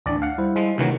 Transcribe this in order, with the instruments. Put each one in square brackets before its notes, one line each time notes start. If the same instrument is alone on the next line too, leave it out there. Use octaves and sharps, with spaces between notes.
[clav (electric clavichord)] A1 D5 [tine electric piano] D2 D4
[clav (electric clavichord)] F5 F#5
[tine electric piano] G3 E4 C5
[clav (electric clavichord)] F3 G#3
[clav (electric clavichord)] D2 E3 F#3 [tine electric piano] C3 D#3